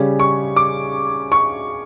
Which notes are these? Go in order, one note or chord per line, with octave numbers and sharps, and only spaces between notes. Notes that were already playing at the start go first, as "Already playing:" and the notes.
Already playing: C#3 G3 C#4
C#6
D6
C#6